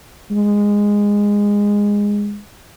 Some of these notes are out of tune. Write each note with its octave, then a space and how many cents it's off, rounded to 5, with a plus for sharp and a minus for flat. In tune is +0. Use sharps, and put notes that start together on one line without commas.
G#3 -15